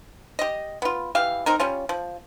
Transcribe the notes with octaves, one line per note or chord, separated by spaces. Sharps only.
G4 D#5
B3 F4
E3 G4 F5
C4 D#4 A#4
G3 C#4 F4
F3